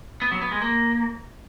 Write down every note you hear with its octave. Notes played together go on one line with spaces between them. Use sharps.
B3
F#3
B3
G#3
A#3